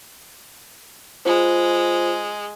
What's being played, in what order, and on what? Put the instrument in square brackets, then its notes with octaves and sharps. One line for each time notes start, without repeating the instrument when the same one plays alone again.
[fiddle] G#3 [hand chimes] F4 C5